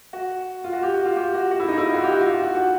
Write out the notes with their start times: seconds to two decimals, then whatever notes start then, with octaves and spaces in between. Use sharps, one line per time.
0.13 F#4
0.64 F4
0.73 F#4
0.83 G4
0.94 F#4
1.05 F4
1.16 G4
1.34 F#4
1.51 F#4
1.60 E4
1.68 D#4
1.78 E4
1.87 F4
1.94 F#4
2.04 G4
2.12 F#4
2.20 F4
2.32 F#4
2.43 F#4
2.55 F#4